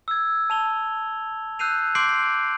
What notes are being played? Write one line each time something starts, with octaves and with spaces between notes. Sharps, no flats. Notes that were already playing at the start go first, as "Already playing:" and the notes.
E6 G#6
A5 F7 G7
E6 F#6 G6 C7 D#7 F7
C6 D6 G6 C7 D7 F#7